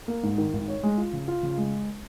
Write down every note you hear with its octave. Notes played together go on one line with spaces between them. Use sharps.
A#3
G#2
D#3
G#1
C#5
G#3
F4
C#3
F4
C#3
G#3